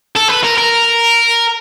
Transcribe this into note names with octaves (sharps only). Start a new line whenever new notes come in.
A4
B4
A#4
A#4